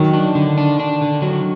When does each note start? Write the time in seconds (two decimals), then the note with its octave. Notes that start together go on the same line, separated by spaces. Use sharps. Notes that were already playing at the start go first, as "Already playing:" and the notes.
Already playing: D#3 F#3
0.13 D4
0.35 D3
0.58 D4
0.80 D4
1.01 D3
1.22 F#3